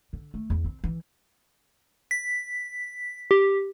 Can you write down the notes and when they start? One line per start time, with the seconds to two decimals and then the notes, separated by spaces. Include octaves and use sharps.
0.13 D3
0.34 A3
0.50 E2
0.65 C4
0.84 E3
2.11 B6
3.31 G4